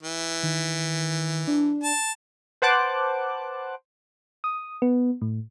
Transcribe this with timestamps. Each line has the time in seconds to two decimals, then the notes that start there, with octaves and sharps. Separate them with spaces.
0.03 E3
0.43 D#3
1.48 D4
1.83 A5
2.62 B4 C5 F#5 A5 D6 F#6
4.44 D#6
4.82 B3
5.22 A2